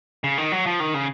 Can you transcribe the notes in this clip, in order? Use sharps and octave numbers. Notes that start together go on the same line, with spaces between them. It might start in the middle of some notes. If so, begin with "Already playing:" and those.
C#3
D#3
F#3
F3
D#3
C#3